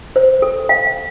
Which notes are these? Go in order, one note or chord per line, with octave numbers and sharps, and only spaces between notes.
C5
A4
F5